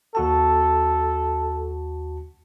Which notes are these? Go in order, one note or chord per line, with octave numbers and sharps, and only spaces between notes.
D#2 F#4 A4 A5